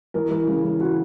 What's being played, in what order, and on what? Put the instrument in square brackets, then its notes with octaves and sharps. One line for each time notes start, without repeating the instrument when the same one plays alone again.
[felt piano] E3 A#4
E3
C#3
E3
E3 F#4